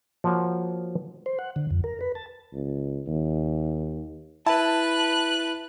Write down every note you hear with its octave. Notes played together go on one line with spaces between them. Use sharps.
F3 A#3 F#4 C#5
C5
F#5
D3
F2
A#4
B4
A5
C#2
D#2
E4 B4 A5 F#6